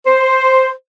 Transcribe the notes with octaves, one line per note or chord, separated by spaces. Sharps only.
C5